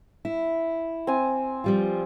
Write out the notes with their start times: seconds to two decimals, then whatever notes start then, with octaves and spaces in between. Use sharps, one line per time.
0.25 E4
1.07 C4 G#5
1.64 F3 G3 F4